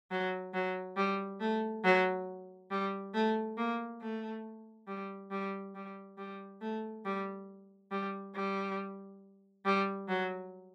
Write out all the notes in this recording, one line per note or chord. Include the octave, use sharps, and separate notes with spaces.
F#3
F#3
G3
A3
F#3
G3
A3
A#3
A3
G3
G3
G3
G3
A3
G3
G3
G3
G3
F#3